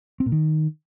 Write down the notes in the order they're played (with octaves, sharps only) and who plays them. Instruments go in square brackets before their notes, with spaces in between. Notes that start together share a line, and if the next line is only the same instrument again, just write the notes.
[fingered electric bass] C4
A#2
D#3